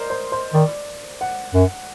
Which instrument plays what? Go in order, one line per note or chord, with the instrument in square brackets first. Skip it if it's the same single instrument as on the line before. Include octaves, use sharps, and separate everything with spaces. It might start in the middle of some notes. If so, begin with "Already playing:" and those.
Already playing: [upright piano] A#4 C5 D5 D#5
C5
C5
[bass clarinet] D#3 [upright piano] D5
[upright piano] F#5
[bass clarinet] F#2